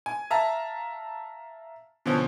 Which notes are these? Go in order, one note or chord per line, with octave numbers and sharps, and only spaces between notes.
G#5
E5 F5 A5 A#5
B2 D3 F3 C4 C#4